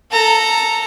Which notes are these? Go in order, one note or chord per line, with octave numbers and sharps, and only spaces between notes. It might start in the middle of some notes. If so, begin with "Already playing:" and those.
A4 A#5